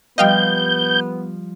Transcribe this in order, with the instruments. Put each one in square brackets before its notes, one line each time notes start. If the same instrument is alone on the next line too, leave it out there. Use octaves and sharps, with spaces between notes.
[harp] F3 G3 F4 [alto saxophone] B3 [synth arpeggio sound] D#5 F5 G5 [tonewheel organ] G6